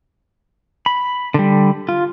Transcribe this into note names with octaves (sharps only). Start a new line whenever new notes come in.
B5
D3 G3
F4